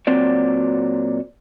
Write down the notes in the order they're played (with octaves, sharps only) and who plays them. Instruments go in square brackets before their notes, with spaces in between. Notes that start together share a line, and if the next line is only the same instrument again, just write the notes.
[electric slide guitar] A#2 F#3 C4 F#4 D5